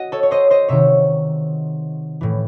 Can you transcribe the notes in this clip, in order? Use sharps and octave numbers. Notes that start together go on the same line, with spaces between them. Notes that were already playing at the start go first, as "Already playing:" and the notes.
Already playing: F#4 D#5 F#5
A4 C#5
C#5
C5 D#5
C5 D#5
C3 D#3 C#5 E5
A2 E3